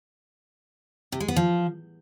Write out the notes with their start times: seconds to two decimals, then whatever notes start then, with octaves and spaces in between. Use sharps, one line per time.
1.12 C3
1.20 G#3
1.28 B3
1.36 F3